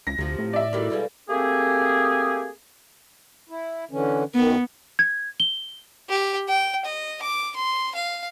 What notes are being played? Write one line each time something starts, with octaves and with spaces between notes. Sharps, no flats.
C#2 A#6
D2 C3 F3
A2
D5 E5
D#3 G3 E4 F#4 A4
B2 G3 G#3 A4 B4 F5
A3 A#3 C4 G4 G#4
E4
D3 E3 C#4
F#2 D#3 B3
G#6
G7
G4
G5
D#5
D6
C6
F5